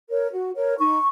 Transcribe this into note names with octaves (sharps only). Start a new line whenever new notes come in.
A#4 C#5
F#4
A#4 C#5
D#4 C#6